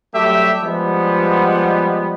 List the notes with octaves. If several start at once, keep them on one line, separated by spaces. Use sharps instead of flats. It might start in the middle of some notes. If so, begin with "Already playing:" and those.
F#3 G3 A3 G4 E5
F3 G3 G#3 B3